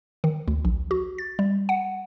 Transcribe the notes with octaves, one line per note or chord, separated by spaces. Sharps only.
D#3
D2
A#1
F#4
A6
G3
F#5